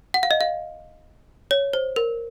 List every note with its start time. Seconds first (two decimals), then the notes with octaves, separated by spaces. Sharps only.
0.14 F#5
0.23 F5
0.31 D#5
0.41 F5
1.51 C#5
1.73 C5
1.96 A#4